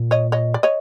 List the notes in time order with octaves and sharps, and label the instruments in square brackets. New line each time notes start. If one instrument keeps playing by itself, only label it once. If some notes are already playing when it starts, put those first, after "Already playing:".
Already playing: [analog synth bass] A#2
[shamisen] C#5 D#5
C#5 D#5
D5
C#5 D#5